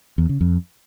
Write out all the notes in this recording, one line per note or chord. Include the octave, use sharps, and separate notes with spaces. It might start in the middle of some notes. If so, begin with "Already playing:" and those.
E2
C#3
F2